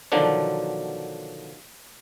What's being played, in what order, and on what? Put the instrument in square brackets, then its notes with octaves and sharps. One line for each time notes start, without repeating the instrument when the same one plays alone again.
[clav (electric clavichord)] B2 D3 D#3 F3 F#3 D4